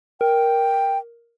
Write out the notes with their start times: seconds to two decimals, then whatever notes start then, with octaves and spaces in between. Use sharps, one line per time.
0.21 A#4 G5